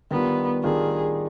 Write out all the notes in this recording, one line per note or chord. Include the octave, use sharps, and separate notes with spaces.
D#3 G3 B3 D4 F4
D#3 G3 D4 F4 G#4